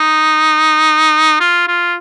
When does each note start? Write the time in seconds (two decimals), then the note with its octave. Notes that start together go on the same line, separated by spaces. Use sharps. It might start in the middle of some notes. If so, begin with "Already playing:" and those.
Already playing: D#4
1.40 F4
1.68 F4